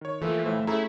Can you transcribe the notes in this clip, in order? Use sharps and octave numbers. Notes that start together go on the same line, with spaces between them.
D#3 C#5
E3 F3 A3 A#3 F4
A2 A3 C5 E5 F5
A3 C#4 E4 G#4 A4 A#5